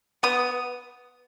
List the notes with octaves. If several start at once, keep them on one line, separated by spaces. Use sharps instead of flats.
B3 D#6